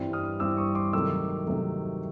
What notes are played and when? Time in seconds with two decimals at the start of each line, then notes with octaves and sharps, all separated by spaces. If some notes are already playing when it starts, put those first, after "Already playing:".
Already playing: G2 E3 G3 C4
0.13 D#6 F6
0.39 G2 E3 G3 C4 D6 E6
0.57 C#6 D#6
0.75 C6 D6
0.93 C3 D#3 F#3 A3 D6 E6
1.46 C3 D#3 F#3 A3